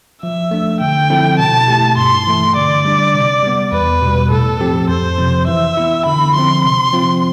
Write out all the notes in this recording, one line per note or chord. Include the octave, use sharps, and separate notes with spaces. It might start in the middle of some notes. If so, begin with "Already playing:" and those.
F3 E5
A3 D4
D3 G5
F3 C4 E4 A4
B2 A5
A3 E4 G4
G2 C6
E3 A3
D3 D5
G3 D4
C3
G3 B3
E2 B4
B2 G3
A2 A4
F3 C4 G4
F2 C5
C3 F3 C4
E3 E5
B3 E4
D3 B5
F3 C4 C6
C3
F3 C4 F4